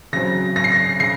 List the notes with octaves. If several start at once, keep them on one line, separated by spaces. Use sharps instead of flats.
C#3 F#3 C4 A#6
A#6
C7
A#6
C#3 C7